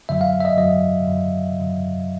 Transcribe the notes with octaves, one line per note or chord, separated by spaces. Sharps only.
F#2 D3 F#3 E5
F5
E5
D#5
F#2 D3 F#3 D#5
F#2 D3 F#3
F#2 D3 F#3